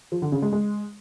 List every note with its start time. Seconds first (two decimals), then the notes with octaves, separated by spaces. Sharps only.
0.12 F3
0.22 D3
0.32 C#3
0.42 G#3
0.52 G#3